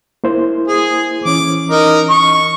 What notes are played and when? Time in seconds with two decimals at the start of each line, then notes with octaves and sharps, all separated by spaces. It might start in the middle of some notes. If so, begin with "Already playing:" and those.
0.24 A#3 E4 C5
0.68 G#4
1.25 E3 C#4 D6
1.70 D#4 A#4
2.09 C#6